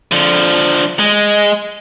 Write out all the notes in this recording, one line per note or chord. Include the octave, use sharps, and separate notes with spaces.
D3 F3
G#3